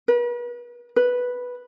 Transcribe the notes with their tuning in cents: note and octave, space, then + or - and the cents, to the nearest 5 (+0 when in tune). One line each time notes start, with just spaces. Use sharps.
B4 -40
B4 -5